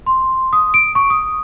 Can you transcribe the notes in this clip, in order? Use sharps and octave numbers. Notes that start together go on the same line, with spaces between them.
C6
D#6
D7
C#6
D#6